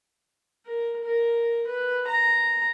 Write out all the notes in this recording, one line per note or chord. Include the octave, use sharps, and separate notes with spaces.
A#4
A#4
B4
A#5